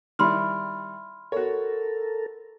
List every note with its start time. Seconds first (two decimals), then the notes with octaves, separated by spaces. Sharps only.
0.19 D#3 G3 E4 B5 C6 F6
1.32 F#4 A4 A#4 C#5